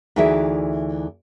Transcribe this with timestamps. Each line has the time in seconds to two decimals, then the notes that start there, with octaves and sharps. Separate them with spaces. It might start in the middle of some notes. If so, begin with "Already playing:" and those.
0.16 D2 E3 D#4 G#4 D5 E5